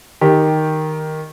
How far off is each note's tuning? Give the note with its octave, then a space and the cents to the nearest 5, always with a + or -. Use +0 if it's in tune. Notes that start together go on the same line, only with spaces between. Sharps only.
D#3 +0 G4 +0